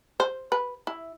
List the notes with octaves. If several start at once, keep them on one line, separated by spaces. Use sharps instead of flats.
C5
B4
E4